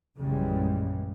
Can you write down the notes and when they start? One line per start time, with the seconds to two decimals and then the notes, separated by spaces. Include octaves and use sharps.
0.17 A#1 F#2 C#3 E3 G3 G#3